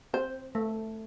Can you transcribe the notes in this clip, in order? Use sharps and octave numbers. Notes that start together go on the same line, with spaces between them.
C4 C5
A3